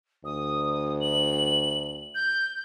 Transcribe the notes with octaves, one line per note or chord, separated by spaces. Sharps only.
D2 D#6
F#7
G6